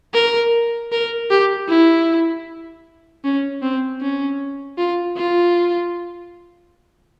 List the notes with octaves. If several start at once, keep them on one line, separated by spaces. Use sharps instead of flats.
A#4
A#4
G4
E4
C#4
C4
C#4
F4
F4